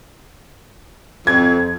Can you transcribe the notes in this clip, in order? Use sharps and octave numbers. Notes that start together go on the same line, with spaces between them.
F2 G#6